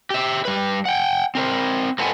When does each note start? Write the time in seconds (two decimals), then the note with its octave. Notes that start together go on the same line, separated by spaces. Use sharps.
0.10 G4 E5
0.45 G3 B4
0.85 F#5 G5
1.35 C4 A#4 C5
1.99 A#3 C4 A4 B4 F#5 G#5